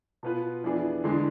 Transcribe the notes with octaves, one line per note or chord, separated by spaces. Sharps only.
B2 B3 F4 B4
F2 E3 B3 D4 G#4
E2 D3 G#3 D4